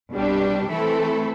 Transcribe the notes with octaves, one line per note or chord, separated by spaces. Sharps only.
C2 B2 G3 D4 G4
E3 A3 C4 E4 A4